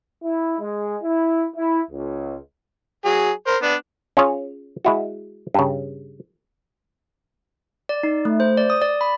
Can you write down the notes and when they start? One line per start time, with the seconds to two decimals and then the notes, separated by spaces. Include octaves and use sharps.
0.23 E4
0.59 G#3
1.02 E4
1.57 E4
1.90 C#2
3.05 F#3 G#4
3.47 A#4 C5
3.63 B3 D4
4.17 C#4 F4 G#4 C#5
4.85 G#3 E4 F#4
5.54 G2 C#3
7.89 D5
8.03 D#4
8.25 A3
8.40 C5
8.58 D5
8.70 D#6
8.82 D5
9.01 B5